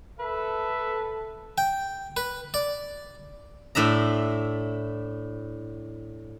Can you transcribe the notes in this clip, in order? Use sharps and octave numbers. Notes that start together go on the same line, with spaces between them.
A4 B4 E5
G5
B4
D5
A2 D4 E5 A#5